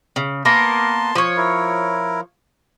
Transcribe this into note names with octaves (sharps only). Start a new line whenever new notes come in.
C#3
A#3 B3 A#4 A5 C6
F3 C#5
E4 A#4